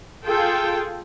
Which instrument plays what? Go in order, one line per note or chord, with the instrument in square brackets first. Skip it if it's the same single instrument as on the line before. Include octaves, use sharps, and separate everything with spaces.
[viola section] F4 G#4 A4 G5